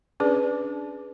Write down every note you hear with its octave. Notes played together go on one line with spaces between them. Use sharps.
C#4 D4 G#4 B4 D5